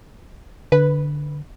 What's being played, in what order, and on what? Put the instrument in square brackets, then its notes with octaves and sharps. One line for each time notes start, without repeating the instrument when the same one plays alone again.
[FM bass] D3 [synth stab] B4